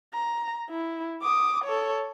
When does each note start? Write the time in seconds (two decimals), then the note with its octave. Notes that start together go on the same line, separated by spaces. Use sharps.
0.14 A#5
0.70 E4
1.22 D6 D#6
1.64 A4 C#5